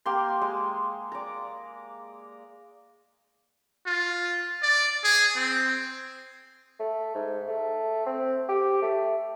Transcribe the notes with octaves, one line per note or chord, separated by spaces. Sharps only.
A#3 G4 C6
G#3
D5 A#5
F4
D5
G#4
C4
A3
G#2
A3
C4
G4
A3